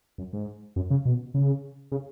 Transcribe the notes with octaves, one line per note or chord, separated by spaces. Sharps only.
F#2
G#2
F#2
C#3
B2
C#3
C#3